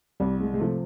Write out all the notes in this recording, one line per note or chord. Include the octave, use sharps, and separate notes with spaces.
C2 G3
G#3
G#3
C3 F3 A3